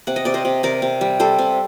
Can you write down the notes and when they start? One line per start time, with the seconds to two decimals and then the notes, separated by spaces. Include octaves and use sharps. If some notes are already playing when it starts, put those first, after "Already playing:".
0.07 C3 F#5
0.16 D#5
0.25 C3 D5
0.34 C5 D#5
0.45 C3
0.63 C3 A#4 D5
0.82 C3
1.01 G3
1.20 G3 A4 C5
1.39 C3